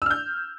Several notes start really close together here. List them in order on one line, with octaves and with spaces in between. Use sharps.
E6 F6 G6